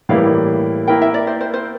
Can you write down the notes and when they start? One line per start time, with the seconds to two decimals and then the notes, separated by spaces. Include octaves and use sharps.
0.09 A2 E3 G3 A#3 E4 F5
0.87 A#3 E4 A#4 G5
1.02 E5
1.14 D5
1.27 C5
1.41 C5
1.54 C5